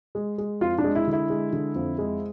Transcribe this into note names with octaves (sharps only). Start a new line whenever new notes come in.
G#3
G#3
F2 F4
D4
G#3
E4
D3
E4
G#3
D3
F2
G#3